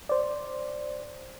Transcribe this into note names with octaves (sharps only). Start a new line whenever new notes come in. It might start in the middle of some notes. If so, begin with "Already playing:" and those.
C5 D5